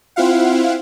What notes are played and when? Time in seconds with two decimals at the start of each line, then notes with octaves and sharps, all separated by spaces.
0.16 C4 E4 F4 F5 F#5